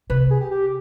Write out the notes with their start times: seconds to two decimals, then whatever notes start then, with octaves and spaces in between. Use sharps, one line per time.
0.10 C3 B4
0.30 G#4
0.41 G4
0.51 G4